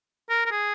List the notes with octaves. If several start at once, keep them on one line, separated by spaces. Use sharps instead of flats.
A#4
A#4
G#4